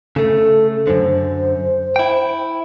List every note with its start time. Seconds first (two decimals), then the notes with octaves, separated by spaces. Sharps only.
0.16 C#3 A3 A4
0.87 F#2 D3 C5
1.96 E4 G5